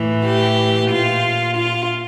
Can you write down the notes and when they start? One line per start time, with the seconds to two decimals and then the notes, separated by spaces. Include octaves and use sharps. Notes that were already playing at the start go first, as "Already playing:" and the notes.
Already playing: A2 E3
0.25 G4
0.90 A#2 F4
1.56 F4